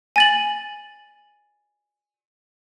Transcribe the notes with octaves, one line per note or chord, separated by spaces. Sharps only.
G#5 A6 F#7